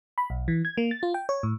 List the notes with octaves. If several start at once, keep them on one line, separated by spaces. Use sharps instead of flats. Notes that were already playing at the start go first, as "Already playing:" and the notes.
B5
B1
E3
G#6
A#3
A6
F4
G5
C#5
A2